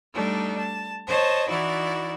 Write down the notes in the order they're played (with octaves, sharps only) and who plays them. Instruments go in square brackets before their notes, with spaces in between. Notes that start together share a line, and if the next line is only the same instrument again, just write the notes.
[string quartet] G3 A3 D4 D#4
A5
C5 C#5 D#5 A5
E3 D#4 E4 F#4 D5